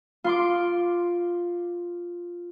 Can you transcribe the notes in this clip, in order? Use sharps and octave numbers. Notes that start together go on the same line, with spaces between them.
F4 C6 D6